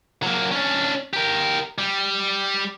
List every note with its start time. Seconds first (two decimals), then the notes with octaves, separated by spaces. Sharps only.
0.23 F#3 A#3
0.51 C#4 D4
1.13 G4 A#4
1.78 G3